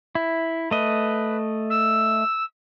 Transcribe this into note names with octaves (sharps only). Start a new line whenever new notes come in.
E4
A3 B4 D#5
E6